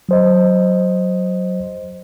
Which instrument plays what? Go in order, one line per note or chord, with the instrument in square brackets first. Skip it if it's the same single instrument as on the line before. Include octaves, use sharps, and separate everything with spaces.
[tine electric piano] F#3 C5 D#5